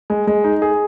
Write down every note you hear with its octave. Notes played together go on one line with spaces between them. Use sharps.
G#3
G#3
D#4
G#4